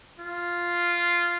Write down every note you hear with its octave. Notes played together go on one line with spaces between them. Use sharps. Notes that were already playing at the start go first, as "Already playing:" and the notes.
F4